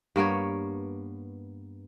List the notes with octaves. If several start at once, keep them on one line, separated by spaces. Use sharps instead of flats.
G2 A#3 B3 C#5